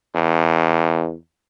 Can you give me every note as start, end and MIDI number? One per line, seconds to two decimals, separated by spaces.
0.15 1.14 40